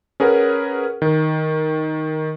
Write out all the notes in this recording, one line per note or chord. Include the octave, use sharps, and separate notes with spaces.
C#4 G#4 A#4 B4 F#5
D#3